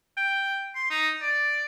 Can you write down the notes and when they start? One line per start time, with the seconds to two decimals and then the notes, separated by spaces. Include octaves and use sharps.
0.17 G5
0.75 C6
0.90 D#4
1.22 D5